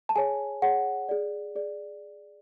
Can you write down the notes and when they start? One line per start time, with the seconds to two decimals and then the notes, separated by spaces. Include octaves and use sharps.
0.09 A5
0.16 G#4 C#5 G#5
0.62 G#4 C#5 F#5
1.09 G#4 D5
1.56 G#4 D5